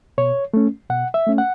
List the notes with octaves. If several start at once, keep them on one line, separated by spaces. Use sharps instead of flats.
B2 C#5
A3 C#4
B2 F#5
E5
A3 C#4
F#5